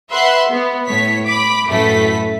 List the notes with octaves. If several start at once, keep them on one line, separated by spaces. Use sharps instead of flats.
B4 E5 F#5 C6 F#6
B3
A2 C#5 B6
B5 D6 B6
F#2 A2 A3 B4 B6